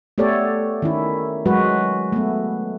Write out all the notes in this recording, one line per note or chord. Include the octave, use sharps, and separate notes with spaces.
A3 B3 G4 A4 C#5 D5
D#3 C#4 E4
F#3 G#3 F#4 B4
A3 B3